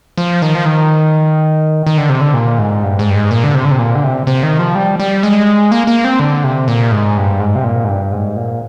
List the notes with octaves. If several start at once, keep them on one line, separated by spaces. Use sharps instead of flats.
F3
D#3
F3
D#3
D#3
D3
C3
D3
A#2
G#2
G2
G#2
G2
G#2
A#2
D3
C3
D3
C3
A#2
D3
C3
C3
D#3
F3
G3
G3
G#3
A#3
A#3
C4
D3
C3
A#2
G#2
G2
G#2
C3
A#2
G#2
G2
G#2
A#2